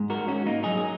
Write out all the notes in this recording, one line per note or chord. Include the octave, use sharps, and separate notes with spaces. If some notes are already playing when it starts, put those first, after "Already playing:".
Already playing: G#2 G#3
F#4 A#4
C#4 F#4
A#3 D#4
G#2 F#3 D#4 G#4
G#4